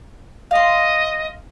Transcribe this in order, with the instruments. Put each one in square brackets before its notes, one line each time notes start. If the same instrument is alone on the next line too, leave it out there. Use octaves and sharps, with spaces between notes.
[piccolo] D#5 [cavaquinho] F5 C6